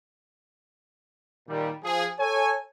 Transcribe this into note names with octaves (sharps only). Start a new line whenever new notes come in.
A#2 D#3 G3
F3 G#4
A4 C#5 G#5